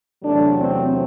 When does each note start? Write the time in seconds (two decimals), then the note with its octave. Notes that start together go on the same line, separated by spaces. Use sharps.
0.23 E2 C3 F#3 A3 D4
0.60 C4